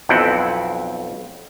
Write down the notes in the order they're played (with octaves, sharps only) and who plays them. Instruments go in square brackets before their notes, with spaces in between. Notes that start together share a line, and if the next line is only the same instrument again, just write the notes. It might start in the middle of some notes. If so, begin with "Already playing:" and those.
[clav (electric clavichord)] B1 F2 C4 E4 F#5 G5